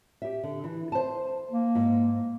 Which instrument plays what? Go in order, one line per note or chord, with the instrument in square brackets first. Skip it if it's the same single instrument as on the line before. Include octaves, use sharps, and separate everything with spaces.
[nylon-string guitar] G4 E5
D3
E3
C5 A5
[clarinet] A#3
[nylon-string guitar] G#2